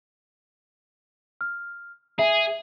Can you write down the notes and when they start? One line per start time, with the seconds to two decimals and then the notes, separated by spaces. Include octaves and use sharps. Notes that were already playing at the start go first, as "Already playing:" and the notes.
1.41 F6
2.19 G#4 E5